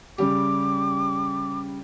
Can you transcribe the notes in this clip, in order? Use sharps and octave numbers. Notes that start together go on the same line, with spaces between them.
C#3 G3 G4 D6